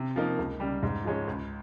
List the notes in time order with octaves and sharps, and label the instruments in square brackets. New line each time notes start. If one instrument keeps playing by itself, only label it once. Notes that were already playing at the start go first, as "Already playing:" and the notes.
Already playing: [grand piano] C3
F3 A#3 D#4
C#2
C#3 G3
G#2
F3 G#3 C#4
C#2